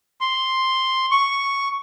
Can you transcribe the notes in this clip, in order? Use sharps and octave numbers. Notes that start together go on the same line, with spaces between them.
C6
C#6